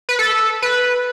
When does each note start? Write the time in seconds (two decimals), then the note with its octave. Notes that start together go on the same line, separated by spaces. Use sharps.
0.09 B4
0.19 A4
0.62 B4